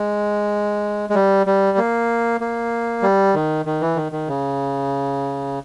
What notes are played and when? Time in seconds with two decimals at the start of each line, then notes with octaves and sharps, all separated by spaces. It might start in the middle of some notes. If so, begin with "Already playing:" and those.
Already playing: G#3
1.10 G#3
1.15 G3
1.47 G3
1.78 A#3
2.41 A#3
3.02 G3
3.35 D#3
3.66 D#3
3.81 E3
3.96 D#3
4.12 D#3
4.28 C#3